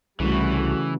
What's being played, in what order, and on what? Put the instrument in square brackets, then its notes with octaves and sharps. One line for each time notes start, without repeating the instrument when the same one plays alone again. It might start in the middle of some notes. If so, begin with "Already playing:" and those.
[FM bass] C2 [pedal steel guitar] C#3 [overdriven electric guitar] E3 [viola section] G3 A3 F#4